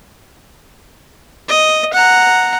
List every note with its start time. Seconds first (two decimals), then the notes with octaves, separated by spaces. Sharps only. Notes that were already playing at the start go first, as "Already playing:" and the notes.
1.48 D#5
1.93 F#5 A#5